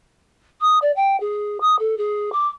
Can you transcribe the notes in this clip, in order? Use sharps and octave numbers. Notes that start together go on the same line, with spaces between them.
D#6
D5
G5
G#4
D#6
A4
G#4
D6